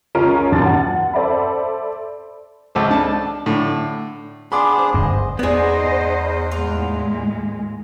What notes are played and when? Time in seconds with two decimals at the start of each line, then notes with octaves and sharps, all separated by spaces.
0.15 C#2 C#4 F4 A#4 D7
0.52 D#2 A#2 F#3 A5 A6
0.66 F#5
1.13 A4 C5 D5 E5 B5
2.75 C#2 A4 C5
2.90 D4 A5
3.46 A2 D3
4.52 B3 D4 G#4 B5 C6 D6
4.79 C5
4.94 D1 G1 G2 D#5
5.39 E2 B3 D#4 G#4 B4 C5 D5 D#5
6.52 D#2 A2 G#3 F4